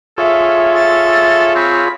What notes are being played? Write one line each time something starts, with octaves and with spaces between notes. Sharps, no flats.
F4 G#4 A4 C#5 E5
E5 A6
C4 B5